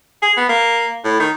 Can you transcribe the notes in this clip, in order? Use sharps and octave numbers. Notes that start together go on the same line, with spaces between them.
G#4
B3
A#3
A2
D#3